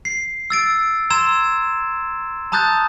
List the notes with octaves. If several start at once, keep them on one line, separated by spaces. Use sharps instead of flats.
C7
E6 A6 D7
A#5 C6 E6 G#6 E7
A5 A#5 D#6 F#6 G6 A6